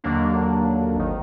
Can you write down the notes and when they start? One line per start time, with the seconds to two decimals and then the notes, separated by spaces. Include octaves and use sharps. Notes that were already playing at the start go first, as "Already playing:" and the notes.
0.04 D#2 D3 F#3 A#3 D4
0.95 G#1 D#3